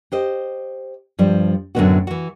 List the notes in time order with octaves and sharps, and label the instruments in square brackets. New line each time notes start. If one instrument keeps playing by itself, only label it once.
[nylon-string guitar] G4 C5 D#5
G2 F3 G3
F#2 A2 D3 D#3 B3 F#4
E3 F#4